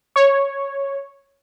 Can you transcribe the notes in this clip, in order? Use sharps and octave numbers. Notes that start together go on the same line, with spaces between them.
C#5